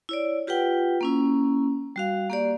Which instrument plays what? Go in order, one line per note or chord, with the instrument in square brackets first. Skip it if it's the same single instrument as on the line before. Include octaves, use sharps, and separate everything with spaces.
[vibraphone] E4 C#5 D5
F4 G4 B4 F#5 G5
A#3 C#4 E4
G3 F#4 F5
A#3 G4 D5